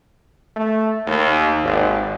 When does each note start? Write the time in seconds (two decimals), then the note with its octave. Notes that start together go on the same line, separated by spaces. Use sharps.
0.57 A3
1.07 D#2
1.64 G#1